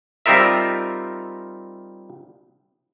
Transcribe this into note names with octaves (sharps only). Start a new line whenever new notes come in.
G3 C4 D#4 F4 A#4 E5